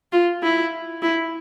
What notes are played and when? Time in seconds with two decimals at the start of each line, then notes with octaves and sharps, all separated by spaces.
0.12 F4
0.43 E4
1.02 E4